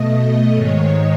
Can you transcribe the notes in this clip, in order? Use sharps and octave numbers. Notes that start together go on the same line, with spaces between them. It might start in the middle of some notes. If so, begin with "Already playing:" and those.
Already playing: B2 A3 D#5
G#2 D#3 G#3 C#5